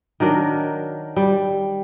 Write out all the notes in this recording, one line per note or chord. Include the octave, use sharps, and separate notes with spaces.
D#3 F#3 D4 A#4
G3